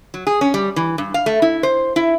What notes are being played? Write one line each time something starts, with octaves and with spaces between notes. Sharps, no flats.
F#3
G#4
C#4
G3
E3
G2
F5
A3
E4
C5
E4